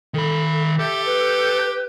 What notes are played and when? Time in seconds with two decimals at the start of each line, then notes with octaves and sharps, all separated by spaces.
0.14 D#3 A4 B5
0.79 G4 A4 E5
1.06 B4